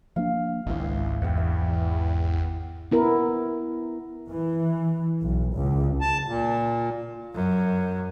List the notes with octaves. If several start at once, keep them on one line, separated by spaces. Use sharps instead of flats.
F3 A#3 D4 F5
G#1 C#2 G#2 E4 C6
E2 F#5 G5
E5
B3 E4 A#4
E3
B1
C#2
A5
A#2
F#2